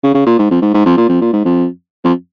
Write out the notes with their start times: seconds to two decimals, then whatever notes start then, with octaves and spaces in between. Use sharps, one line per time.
0.03 C#3
0.14 C#3
0.26 A#2
0.39 G#2
0.51 F2
0.62 G#2
0.74 G#2
0.86 F2
0.97 A#2
1.09 F2
1.21 A#2
1.33 G#2
1.45 F2
2.04 F2